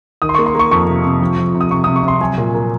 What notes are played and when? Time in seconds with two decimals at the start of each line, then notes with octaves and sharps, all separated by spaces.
0.22 D#3 D#6
0.29 C6
0.35 C#6
0.38 A#3
0.46 C6
0.55 A#3 C#6
0.71 F2 C#6
0.88 C3
1.05 C3
1.21 F3
1.38 F3
1.54 C3
1.61 D#6
1.71 C3 C#6
1.84 C3 D#6
1.96 C#6
2.03 C3 C6
2.21 F#3 G#5
2.38 A#2
2.54 A#3